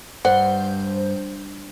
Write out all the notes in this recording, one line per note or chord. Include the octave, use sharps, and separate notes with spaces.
G2 C5 F#5